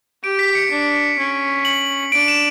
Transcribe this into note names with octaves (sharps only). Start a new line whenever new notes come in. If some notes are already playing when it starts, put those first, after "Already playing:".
G4 D7
B6
C#7
D4
C#4
F#7
D4 D7
E7